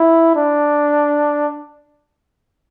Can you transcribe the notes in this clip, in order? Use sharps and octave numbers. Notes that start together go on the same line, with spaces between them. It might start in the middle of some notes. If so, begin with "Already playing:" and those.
Already playing: E4
D4